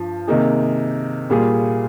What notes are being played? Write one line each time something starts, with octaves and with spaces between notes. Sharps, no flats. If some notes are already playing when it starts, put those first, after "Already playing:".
Already playing: G2 F3
C3 D#3 A#3 D#4 G#4
A#2 G3 A#3 F4 G#4